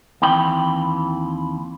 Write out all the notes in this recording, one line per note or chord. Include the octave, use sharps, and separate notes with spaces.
D#2 E3 C4 G5 B5